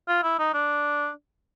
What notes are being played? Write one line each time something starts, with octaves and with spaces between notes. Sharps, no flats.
F4
E4
D#4
D4